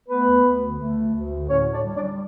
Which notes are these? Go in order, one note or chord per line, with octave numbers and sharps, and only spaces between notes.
A3 B3 B4
D2
D2
D3
A3
D2
D2
D3
A2 C#4 C#5
A2
D4 D5
G3
D4 D5
G3